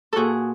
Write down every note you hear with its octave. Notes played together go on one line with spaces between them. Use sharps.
A#2 F#4 G#4 A4